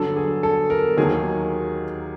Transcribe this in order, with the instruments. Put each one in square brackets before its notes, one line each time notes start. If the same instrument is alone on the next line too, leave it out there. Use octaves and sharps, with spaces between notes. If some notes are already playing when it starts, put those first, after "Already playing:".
Already playing: [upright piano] G2 D3 F#3 A4
G#4
A4
A#4
D#2 D#3 F#3 A#3 G#4